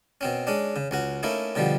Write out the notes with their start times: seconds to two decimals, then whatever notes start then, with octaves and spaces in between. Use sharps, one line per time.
0.21 B2 C4 C#4
0.47 G#3 C#4 D4
0.76 C#3
0.91 C#2 C#4 F#4
1.23 A3 A#3 C#4 D#4 E4
1.56 B2 D3 F3 G3